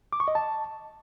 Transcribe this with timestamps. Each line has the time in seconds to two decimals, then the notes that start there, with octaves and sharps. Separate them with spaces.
0.13 D6
0.20 C#6
0.28 D#5
0.35 A5